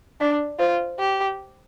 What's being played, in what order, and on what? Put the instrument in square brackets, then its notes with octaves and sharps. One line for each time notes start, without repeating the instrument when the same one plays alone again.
[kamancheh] D4 [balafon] D5
[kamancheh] F4 [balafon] C5
[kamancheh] G4